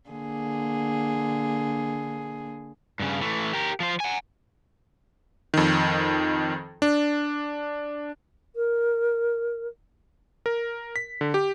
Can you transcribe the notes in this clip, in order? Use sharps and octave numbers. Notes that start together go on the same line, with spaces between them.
D3 A#3 G#4
G2 C#3
E3 A3
G4 A#4
F3 C5
F#5 G#5
F2 D#3
D4
A#4
A#4
B6
D3
G4